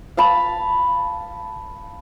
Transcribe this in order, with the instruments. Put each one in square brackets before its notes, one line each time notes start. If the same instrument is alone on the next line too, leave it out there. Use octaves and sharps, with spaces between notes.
[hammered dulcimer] F5 A5 B5